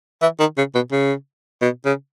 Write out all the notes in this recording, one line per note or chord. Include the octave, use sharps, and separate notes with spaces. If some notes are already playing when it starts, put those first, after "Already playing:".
E3
D#3
C#3
B2
C#3
B2
C#3